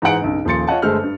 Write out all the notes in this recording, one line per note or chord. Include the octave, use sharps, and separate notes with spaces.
G#2 E3 D#4 G#4 F#5 D7
B1 G2 C#3
D#1 F3 A#3 C6 A6 C#7
F4 C#5 D#5 F#5 A5
G1 G#3 A3 A4 C5 F6
G2